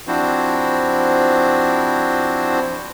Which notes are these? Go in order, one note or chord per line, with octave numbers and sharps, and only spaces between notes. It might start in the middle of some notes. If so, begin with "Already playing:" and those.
F3 C4 D4 E4 F#4 C5